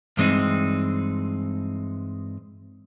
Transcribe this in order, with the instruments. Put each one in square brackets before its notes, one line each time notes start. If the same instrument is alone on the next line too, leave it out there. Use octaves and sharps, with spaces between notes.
[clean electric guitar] G2 E3 G#3 B3 C4 D#4